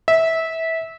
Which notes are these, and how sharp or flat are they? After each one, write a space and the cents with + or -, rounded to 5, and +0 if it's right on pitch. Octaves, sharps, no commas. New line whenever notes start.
E5 -20